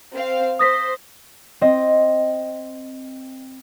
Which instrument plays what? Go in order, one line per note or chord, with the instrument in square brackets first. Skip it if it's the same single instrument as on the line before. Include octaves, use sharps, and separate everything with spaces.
[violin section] C4 F5
[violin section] C5 [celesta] D#6 A#6 B6
[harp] C4 D#5